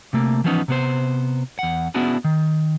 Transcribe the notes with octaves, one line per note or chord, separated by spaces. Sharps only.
C3 A3 A#3
E3 F3 G3 B3 C#4 D#4
C3 B3 C5
E2 F#5
B3 C#4 D4 E4 F#4 G#4
D#3